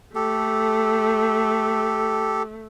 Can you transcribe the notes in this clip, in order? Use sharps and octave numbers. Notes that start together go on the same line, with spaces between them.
A3 G4 A4